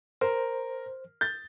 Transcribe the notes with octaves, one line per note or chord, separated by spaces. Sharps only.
A#4 C5
G6 A6